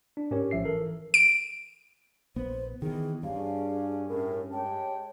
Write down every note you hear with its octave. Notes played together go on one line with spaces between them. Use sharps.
D4
G#2 C#4 G4 A#4 C#5
A1 F3 E5 C7
E3 A4 A#4
D7
A#1 B3 C5
D#3 E3 B3 G#4
G2 C#4 D4 G#4 F5
A2 C#4 G#4 A#4
G#3 G4 C#5 G5 A5